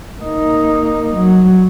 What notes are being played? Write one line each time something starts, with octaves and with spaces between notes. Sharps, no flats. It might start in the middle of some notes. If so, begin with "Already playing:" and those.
A#3 D#4
F#3